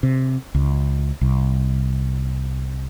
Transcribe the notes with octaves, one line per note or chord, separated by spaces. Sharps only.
C3
C#2
C2